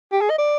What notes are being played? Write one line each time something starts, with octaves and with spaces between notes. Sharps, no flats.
G4
G#4
D#5
D5